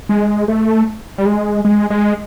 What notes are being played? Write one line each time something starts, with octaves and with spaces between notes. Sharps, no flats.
G#3
A3
G3
G#3
G#3
G#3